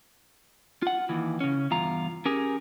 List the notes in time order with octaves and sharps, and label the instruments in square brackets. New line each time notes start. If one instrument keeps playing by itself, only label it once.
[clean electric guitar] F4 F#5
D#2 E3
C#3 C#4
E2 G2 F4 A#5
C#4 G4 G#4 A#4